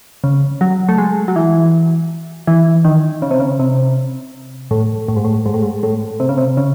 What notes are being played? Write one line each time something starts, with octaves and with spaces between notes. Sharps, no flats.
C#3
F#3
A3
G#3
F#3
E3
E3
D#3
C#3
C3
C#3
C3
A2
A2
G#2
A2
G#2
A2
G#2
A2
C3
C#3
C3
C#3